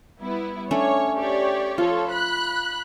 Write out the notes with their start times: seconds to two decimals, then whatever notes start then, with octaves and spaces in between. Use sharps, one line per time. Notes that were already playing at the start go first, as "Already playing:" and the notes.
0.19 G3 B3 E4
0.71 A3 C#4 D4 C#5
1.17 G4 C#5 D5
1.78 F3 F4 A4 C#5
2.10 B5 F#6